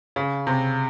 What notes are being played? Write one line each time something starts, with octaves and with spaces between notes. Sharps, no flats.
C#3
C3